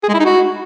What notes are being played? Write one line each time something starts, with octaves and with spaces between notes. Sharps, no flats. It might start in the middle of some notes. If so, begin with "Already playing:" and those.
G#4
G#3
E4
D#4
F#4